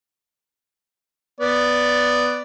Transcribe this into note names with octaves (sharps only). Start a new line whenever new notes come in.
B3 D5